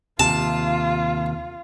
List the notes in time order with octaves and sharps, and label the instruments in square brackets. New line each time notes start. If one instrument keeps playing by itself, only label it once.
[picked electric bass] D#2 C3 [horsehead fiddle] F4 [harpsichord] A5